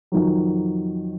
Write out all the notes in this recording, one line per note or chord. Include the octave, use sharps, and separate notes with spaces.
F2 D#3 F#3